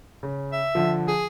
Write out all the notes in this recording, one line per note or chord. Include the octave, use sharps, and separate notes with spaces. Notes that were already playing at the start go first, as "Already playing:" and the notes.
C#3
E5
D3 F3
G#4